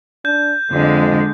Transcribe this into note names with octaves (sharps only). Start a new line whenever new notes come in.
D4 G6
F2 D3 G#3